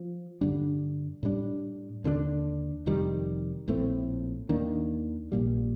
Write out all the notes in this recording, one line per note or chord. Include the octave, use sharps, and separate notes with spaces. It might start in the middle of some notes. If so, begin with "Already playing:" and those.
Already playing: F3
G2 D3 G3 D4
A2 G3 D4
D#2 D3 G3 D4
F1 F2 D#3 G3
A#1 A2 A3 C4
D#2 D#3 A#3 D4
A#1 A#2 G3